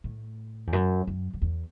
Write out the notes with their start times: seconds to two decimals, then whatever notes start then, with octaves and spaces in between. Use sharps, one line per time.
0.04 A2
0.67 E2
0.73 F#2
1.07 F#2
1.33 F#2
1.42 E2